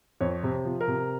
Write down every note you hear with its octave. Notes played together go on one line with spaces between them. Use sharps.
F2 C#5
C3
F3
A#4
C3